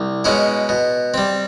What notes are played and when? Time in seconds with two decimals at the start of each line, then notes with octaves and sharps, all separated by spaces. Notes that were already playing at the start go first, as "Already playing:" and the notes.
Already playing: C2
0.24 B2 G#3 C#4 E4
0.69 B2
1.14 G3 C4